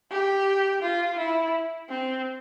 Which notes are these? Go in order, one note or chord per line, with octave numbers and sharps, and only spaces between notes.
G4
F4
E4
C4